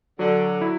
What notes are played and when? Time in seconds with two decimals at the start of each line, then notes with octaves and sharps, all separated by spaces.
0.19 D3 F#3
0.61 E4